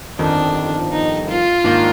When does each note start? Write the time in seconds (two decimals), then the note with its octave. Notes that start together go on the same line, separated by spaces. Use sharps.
0.19 G1 F2 D#3 D4
0.92 D#4
1.29 F4
1.64 G#2 D#3 A#3 D4